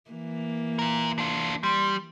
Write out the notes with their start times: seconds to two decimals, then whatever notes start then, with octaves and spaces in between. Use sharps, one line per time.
0.11 E3 A#3
0.79 F4 A#4
1.18 D4 F4
1.63 G3 C6